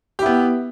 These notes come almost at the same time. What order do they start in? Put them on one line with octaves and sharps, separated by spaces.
G4 E4 B3